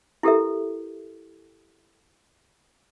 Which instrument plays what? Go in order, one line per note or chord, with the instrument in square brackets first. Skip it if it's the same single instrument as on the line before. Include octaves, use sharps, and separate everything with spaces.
[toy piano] E4 G4 A4 A#4 E5